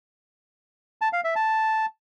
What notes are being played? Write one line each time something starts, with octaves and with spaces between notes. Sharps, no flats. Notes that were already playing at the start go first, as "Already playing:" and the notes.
A5
F5
E5
A5